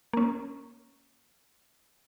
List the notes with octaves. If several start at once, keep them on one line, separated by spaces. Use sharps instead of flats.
A#3 C#4